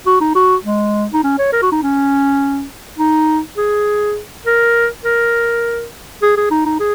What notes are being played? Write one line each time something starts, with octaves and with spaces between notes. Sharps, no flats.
F#4
D#4
F#4
G#3
D#4
C#4
C#5
A#4
F#4
D#4
C#4
D#4
G#4
A#4
A#4
G#4
G#4
D#4
D#4
G#4